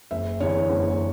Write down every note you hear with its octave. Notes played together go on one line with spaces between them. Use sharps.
F#1 E5
E2 D3 C#5
F#1